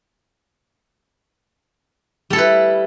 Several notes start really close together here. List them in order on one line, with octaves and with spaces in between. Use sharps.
G3 A4 E4 B4